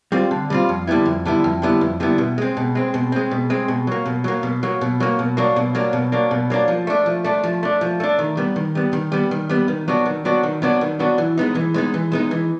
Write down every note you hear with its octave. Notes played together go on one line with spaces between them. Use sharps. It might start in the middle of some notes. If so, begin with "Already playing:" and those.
G3 C4 F4
D3
G3 C4 F4
F2
D3 G3 B3 E4
F2
D3 G3 B3 E4
F2
D3 G3 B3 E4
F2
D3 G3 B3 E4
B2
G#3 C4
B2
G#3 C4
B2
G#3 C4
B2
G#3 C4
B2
F#3 A#3
B2
F#3 A#3
B2
F#3 A#3
B2
F#3 A#3
B2
F#3 A#3 D4
B2
F#3 A#3 D4
B2
F#3 A#3 D4
B2
F#3 A#3 D4
F3
A3 D4
F3
A3 D4
F3
A3 D4
F3
A3 D4
D#3
G3 B3
D#3
G3 B3
D#3
G3 B3
D#3
G3 B3
D#3
F#3 B3 D4 F#4
D#3
F#3 B3 D4 F#4
D#3
F#3 B3 D4 F#4
D#3
F#3 B3 D4 F#4
E3
G#3 B3 D#4
E3
G#3 B3 D#4
E3
G#3 B3 D#4
E3